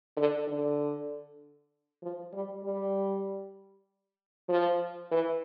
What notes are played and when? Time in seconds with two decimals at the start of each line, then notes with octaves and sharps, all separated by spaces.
0.17 D3
0.47 D3
2.02 F3
2.33 G3
2.64 G3
4.49 F3
5.11 E3